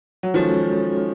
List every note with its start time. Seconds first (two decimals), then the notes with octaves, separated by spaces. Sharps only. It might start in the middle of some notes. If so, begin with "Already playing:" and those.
0.23 F#3
0.34 D#3 F3 G#3 C#4 F#4 A4 C#5